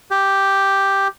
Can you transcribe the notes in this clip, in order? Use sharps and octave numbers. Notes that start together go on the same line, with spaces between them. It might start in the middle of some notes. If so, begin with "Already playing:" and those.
G4